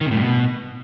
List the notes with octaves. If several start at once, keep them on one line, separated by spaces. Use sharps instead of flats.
D#3
C3
A2
G2
B2